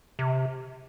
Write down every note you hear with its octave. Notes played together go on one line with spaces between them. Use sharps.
C3